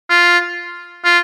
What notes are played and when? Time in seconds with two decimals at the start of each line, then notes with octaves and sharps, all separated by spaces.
0.09 F4
1.04 F4